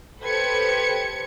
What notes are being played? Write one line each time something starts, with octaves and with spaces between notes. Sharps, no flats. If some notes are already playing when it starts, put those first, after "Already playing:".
G4 A4 B4 C5 G#6 C#7